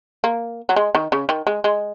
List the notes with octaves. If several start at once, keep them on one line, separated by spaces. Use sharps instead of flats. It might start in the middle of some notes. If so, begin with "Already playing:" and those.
A#3
F#3
G#3
D#3
C#3
D#3
G#3
G#3